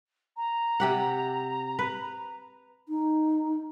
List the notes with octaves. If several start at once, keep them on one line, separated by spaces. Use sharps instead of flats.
A#5
C3 G4 F#5
B4
D#4